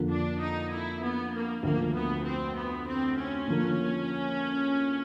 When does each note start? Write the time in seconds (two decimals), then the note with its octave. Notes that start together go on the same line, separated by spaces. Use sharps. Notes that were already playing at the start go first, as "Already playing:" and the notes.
Already playing: F2 D3 F3 A#3
0.10 D4
0.39 D#4
0.71 E4
1.02 B3
1.32 A#3
1.63 D2 D3 F3 A#3
1.94 B3
2.24 C4
2.56 B3
2.86 C4
3.18 C#4
3.48 D3 F3 A#3